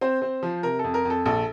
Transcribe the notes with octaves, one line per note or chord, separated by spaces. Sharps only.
C4 C5
C4
F3
C3 A#4
F2 A4
A#4
F2
A4
A#1 A4